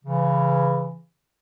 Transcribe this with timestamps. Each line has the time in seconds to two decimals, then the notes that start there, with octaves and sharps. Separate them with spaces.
0.04 C#3 E3